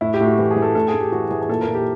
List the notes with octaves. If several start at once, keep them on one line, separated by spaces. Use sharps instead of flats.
A2 E4
G4
A2
F#4
E3 G4
G#4
E3
A4
A2 A4
G#4
A2
G4
E3 F#4
E3 G#4
G#4
A#2 A4
A#4
A#2
G4